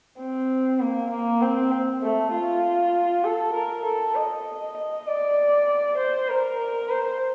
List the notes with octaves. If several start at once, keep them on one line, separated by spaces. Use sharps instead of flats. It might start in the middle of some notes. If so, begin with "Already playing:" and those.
C4
A#3
A#3
C4
A3
F4
A4
A#4
A4
D#5
D#5
D5
C5
A#4
C5